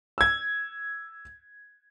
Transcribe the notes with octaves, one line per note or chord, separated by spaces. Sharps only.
E6 G#6